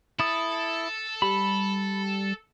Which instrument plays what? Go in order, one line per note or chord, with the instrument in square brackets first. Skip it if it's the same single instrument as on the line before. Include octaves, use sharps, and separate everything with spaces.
[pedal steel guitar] E4 D#6 [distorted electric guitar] A4
[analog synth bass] G3 [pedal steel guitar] B5